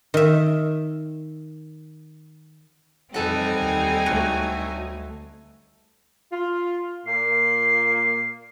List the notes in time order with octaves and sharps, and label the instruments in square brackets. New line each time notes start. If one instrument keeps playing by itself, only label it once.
[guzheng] D#3 E5
[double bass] F2 [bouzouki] E3 A4 F#5 [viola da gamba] G3 C4 [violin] D#4 G#5
[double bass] D#2
[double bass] D2 A3 [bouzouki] F#3
[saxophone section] F4
[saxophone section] A#2 A#3 [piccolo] C7